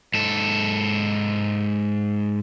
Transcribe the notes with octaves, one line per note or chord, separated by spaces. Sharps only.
G#2 A4